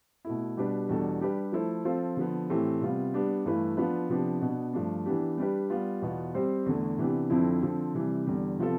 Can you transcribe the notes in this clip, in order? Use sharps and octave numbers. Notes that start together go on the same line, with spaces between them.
B2 A3 E4
B2 G3 D4 G4 B4
E2 B2 G3 D4 A4
G3 D4 G4 B4
F3 A3 E4 A4 C5
F3 C4 F4 A4 C5
D3 F3 B3
A2 E3 A3 C4 G4
C3 G3 B3 F4
G3 B3 D4 G4
G2 E3 A3 E4 B4
F3 B3 D4 F4 B4
C3 F3 B3 D4 G4
B2 B3 D4
G2 F3 A3 D4
E3 B3 D4 G4
G3 D4 G4 B4
G3 B3 F4
E2 B2 B3 F4
G3 C4 G4 C5
E2 D3 A3
C3 E3 B3 D4 G4
F2 D3 F3 C4 E4
D3 F3 C4
C3 E3 G3
E2 D3 G3
C3 F3 B3 F4 A4